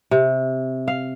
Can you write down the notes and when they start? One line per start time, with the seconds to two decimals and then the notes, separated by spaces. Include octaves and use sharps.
0.11 C3
0.88 F5